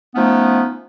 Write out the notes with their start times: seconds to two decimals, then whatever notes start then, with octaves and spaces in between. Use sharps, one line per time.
0.15 F3 A3 B3 C#4 D#4